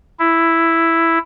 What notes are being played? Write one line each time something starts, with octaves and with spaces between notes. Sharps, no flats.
E4